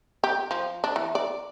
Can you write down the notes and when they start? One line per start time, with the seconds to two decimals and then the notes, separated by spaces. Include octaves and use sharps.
0.24 G4
0.51 F3
0.84 D4
0.96 E3
1.15 D5